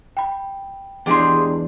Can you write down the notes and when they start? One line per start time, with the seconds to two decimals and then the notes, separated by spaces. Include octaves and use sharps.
0.17 G5 B5
1.06 E2 G#3 D4 G4 G#4 C6